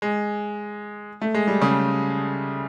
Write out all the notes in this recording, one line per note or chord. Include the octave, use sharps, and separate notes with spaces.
G#3
A3
G#3
G3
C#3